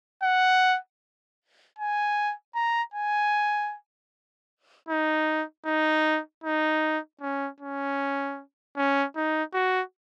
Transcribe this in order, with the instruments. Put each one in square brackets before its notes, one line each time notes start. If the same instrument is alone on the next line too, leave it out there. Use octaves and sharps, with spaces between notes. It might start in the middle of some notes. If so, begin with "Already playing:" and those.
[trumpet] F#5
G#5
A#5
G#5
D#4
D#4
D#4
C#4
C#4
C#4
D#4
F#4